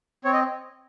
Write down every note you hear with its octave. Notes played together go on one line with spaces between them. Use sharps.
C4 C#5
D#5